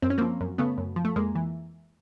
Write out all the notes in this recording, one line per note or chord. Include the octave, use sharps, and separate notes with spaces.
F#2 C4
C#4
F3 A#3 C4
F#2
C#3 A3 B3
F#2
F3
A3
F2 G#3 A#3
E3